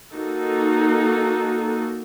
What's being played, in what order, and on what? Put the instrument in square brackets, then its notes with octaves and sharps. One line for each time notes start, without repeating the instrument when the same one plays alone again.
[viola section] A#3 D#4 F#4 A4